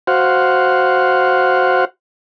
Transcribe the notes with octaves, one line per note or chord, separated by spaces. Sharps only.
F#4 C5 F5 F#5